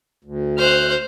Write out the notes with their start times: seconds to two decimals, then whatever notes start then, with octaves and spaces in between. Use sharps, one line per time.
0.25 D2
0.58 C5 F6 F#6